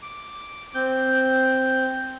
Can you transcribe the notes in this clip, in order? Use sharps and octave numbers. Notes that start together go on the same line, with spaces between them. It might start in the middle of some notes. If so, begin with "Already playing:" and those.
D6
C4 G6